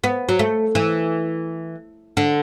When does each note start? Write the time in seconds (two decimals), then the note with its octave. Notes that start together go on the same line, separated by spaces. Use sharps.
0.04 B3
0.29 F#3
0.39 A3
0.75 E3
2.17 D3